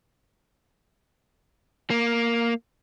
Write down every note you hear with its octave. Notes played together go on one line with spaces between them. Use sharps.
A#3